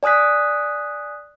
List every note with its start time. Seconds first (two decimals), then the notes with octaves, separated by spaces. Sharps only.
0.03 D5 G#5 D#6 F#6 B6